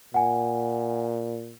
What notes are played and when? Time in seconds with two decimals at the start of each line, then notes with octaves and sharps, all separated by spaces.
0.14 A#2 F#5 G#5